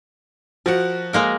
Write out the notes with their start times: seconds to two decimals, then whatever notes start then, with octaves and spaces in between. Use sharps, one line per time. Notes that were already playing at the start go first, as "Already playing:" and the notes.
0.66 F3 F#4 A#4 F#5
1.13 G#3 A#3 A#4